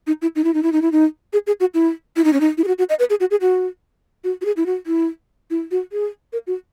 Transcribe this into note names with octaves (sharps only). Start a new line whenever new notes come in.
D#4
E4
D#4
E4
D#4
E4
D#4
E4
D#4
G#4
G#4
F#4
E4
E4
D#4
C#4
D#4
E4
G#4
F#4
F#4
D#5
B4
G#4
F#4
G#4
F#4
F#4
F#4
G#4
E4
F#4
E4
E4
F#4
G#4
A#4
F#4